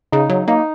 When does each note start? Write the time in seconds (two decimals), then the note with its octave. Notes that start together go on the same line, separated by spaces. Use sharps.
0.12 C#3 D#4
0.30 F#3
0.48 A#3 D#4